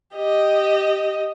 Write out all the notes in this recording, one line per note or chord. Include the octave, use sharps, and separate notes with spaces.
G4 D#5